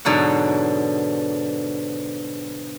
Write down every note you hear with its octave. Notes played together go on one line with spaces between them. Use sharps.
G#2 B2 D3 F#3 F#5